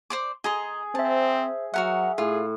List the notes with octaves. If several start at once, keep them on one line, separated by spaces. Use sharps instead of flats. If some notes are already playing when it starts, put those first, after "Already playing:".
C5 D5 D6
G#4 D#5 A#5 C6
C4 C5 E5 A5
F#3 F#4 A#4 E5 F#5
A2 F4 G#4